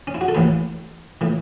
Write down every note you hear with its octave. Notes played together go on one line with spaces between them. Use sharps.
C#4
E4
F#4
A4
A1 A2 E3 B4
A2 E3